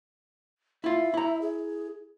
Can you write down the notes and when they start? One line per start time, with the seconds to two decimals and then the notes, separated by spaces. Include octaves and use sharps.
0.84 E4 F4 E5
1.14 E4 A#5
1.42 G#4